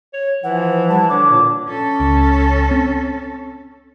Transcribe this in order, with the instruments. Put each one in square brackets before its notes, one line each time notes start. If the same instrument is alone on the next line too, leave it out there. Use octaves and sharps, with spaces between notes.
[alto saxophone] C#5
[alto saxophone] E3 [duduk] F3 [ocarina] F#5
[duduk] G3 [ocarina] A5
[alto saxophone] D3 [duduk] C#5 [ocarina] D6
[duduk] A#2
[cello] C#4 A4
[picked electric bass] C#2
C4